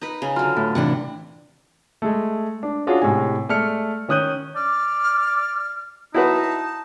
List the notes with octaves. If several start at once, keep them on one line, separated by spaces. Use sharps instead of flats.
D#4 B4
C#3
D3 F#3 F4
A2
C3 E3 D4 F#5
G#3 A3
D4
C#4 D4 F4 F#4 G#4
A2 C3 G#3 G#5
G#3 A3 D5 F6 C#7
D#3 C#4 D#6 F#6 G6 D#7
D5 F6
D#4 E4 F#4 B4 A5